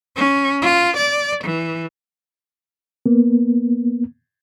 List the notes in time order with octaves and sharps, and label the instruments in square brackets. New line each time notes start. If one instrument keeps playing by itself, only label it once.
[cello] C#4
F4
D5
E3
[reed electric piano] A#3 B3